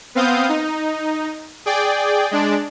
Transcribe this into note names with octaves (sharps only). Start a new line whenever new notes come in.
B3 C4 F5 D#6 G6
D#4
G#4 D5 G5
G#3 D4 D5